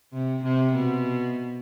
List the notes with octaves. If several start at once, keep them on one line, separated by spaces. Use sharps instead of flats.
C3
C3
B2